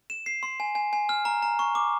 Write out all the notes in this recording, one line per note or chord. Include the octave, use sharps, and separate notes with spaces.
E7
C7
C6
G#5
G#5
G#5
F6
A#5
A#5
C#6
D6